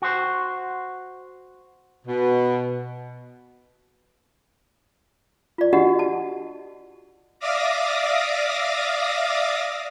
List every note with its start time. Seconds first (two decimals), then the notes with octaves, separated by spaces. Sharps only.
0.02 F#4 C5
2.05 B2
5.58 F4 D5
5.73 D4 F#4 G4 D#5 F#5
5.99 A5
7.40 D5 E5 F5 D6 D#6 A#6